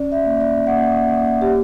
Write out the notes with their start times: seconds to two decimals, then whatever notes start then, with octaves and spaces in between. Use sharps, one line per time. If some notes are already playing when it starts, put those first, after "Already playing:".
Already playing: C#4 D5
0.12 E5
0.26 A#3
0.40 D5
0.67 A#3 F#5
1.09 A#3
1.42 G4